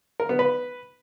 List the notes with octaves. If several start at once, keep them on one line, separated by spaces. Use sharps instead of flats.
A#4
B3
B4